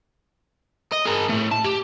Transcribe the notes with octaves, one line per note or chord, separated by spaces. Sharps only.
D#5
G#4 A#4
A2 A3
A5
G4